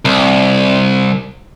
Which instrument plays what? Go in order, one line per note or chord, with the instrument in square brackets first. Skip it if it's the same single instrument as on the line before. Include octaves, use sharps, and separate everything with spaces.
[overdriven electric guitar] C2